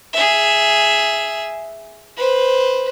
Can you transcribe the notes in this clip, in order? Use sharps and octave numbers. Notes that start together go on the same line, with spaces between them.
G#4 E5
B4 C5